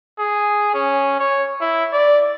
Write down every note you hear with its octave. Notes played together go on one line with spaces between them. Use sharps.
G#4
C#4
C#5
E4
D5